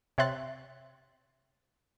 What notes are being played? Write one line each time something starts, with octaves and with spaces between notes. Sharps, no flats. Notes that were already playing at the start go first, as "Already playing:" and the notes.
C3 C#5 E5 C6 F#6 A6